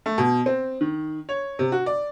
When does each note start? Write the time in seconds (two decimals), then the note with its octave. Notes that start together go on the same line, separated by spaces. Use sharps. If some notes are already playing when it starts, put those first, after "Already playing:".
0.06 A3
0.18 B2
0.46 C4
0.81 D#3
1.29 C#5
1.59 C3
1.72 F#4
1.86 D5